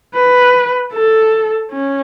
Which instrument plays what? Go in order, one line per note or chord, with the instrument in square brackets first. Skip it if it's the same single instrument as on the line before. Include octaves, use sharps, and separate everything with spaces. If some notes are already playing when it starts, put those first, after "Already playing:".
[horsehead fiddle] B4
A4
C#4